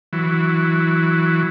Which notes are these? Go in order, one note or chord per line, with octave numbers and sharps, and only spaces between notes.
E3 F#3